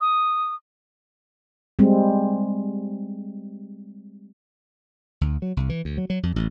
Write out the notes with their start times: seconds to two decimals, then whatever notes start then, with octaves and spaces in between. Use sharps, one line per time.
0.01 D#6
1.79 G3 G#3 C4
5.21 D2
5.42 F#3
5.57 C2
5.69 E3
5.85 D2
5.98 F#3
6.10 F#3
6.23 F2
6.36 A1